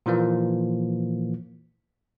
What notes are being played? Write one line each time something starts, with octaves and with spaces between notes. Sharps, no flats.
A#2 E3 F3 A#3